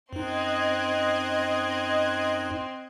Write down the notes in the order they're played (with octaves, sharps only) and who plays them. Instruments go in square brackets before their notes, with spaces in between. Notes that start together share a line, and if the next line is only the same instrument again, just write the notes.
[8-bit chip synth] F#2 D#4 [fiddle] C4 C6 [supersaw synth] D#5 F#6 G#6